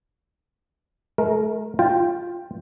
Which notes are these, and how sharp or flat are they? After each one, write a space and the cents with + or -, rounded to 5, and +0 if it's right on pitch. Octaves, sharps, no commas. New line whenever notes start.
A3 -40 A#4 +0
F4 +0 G5 +5